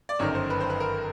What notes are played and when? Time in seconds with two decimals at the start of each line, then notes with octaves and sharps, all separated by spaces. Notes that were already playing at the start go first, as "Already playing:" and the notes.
0.09 D5
0.19 G1 F#2 D#3 C#5
0.35 C5
0.50 B4
0.60 C5
0.70 B4
0.80 A#4